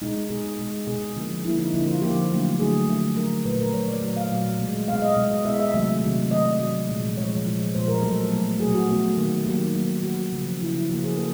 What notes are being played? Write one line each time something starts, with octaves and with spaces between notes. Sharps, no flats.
B2 G#3 D#4
B2 G#3 G#4
B2 G#3
B2 G#3 G#4
D3 F3 A#3
D3 F3 A#3 E4
D#4
D3 F3 A#3 E4
F4
D3 F3 A#3 G4
D3 F#3 A3
D3 F#3 A3 G#4
D3 F#3 A3
D3 F#3 A3 A#4
A#2 F#3 A3 B4
A#4
A#2 F#3 A3 C#5
D5
A#2 F#3 A3 D5
F5
A#2 F#3 A3
B2 G#3
B2 G#3 F5
D#5
B2 G#3
D#5
B2 G#3 E5
E5
C3 D#3 F#3 A3 E5
C3 D#3 F#3 A3
C3 D#3 F#3 A3 D#5
D5
C3 D#3 F#3 A3
A#2 F3 G#3
A#2 F3 G#3 C#5
A#2 F3 G#3
A#2 F3 G#3 C5
A#4
B2 F#3 A3 A4
B2 F#3 A3
B2 F#3 A3 G#4
F#4
B2 F#3 A3
D#3 F#3 A#3
D#3 F#3 A#3 G4
D#3 F#3 A#3
D#3 F#3 A#3 F#4
C#3 F3 A#3
C#3 F3 A#3 E4
E4
C#3 F3 A#3 F#4
G#4
A#3 A4